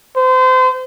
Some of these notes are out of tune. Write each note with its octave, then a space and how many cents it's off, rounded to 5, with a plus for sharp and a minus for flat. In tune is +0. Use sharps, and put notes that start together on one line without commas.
C5 -30